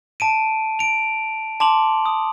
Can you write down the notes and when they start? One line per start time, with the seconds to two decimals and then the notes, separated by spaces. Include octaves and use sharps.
0.20 A5 D7 D#7
0.79 D7 F7
1.60 A5 C6 D6 F7 F#7
2.06 D#6